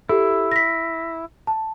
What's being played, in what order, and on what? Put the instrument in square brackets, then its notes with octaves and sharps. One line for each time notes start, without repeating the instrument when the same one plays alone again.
[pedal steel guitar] E4 [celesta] G4 A4
[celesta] A#6 B6
A5